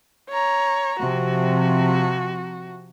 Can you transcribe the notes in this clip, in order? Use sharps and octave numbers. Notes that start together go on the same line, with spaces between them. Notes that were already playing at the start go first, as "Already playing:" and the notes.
C#5 A#5
C3 F3 F#4